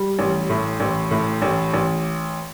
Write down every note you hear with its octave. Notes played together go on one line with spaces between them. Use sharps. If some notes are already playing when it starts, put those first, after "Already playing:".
Already playing: G3
A1
A2
A1
A2
A1
A1